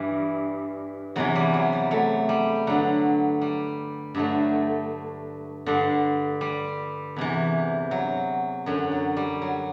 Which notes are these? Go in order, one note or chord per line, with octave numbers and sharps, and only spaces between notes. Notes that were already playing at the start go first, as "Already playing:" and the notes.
Already playing: G2 E3 G3
E2 C3 E3 F#3
G3
F#3
G3
F#3 A3
G3
G2 D3 F#3
G3
G2 D3 F#3 A3
G2 D3
G3
E2 C3 E3
F#3
F#2 D3 F#3
F#3
G3
F#3